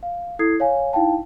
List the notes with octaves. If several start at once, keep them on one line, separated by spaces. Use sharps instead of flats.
F5
E4 A4 D#6 G#6 C7
C#5 F5 G#5
D#4 E4 F5 G5 A5